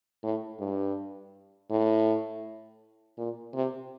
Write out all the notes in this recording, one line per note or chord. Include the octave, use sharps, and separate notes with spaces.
A2
G2
A2
A#2
C3